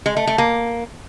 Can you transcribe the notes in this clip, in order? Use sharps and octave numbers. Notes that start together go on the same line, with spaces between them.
G#3
A3
A3
A#3